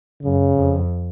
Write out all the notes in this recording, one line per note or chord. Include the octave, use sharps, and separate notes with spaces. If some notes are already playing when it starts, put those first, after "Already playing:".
F#2 C#3
F2